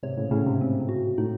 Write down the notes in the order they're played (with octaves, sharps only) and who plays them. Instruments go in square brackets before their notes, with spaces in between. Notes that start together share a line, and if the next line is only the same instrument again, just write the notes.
[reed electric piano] G#2 C3 [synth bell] C#5
[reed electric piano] A2 C#3
[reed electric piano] A2 C#3 [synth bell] C#4
[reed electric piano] G#2 C3
[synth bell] C4
F#4
[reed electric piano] A2 [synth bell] D#4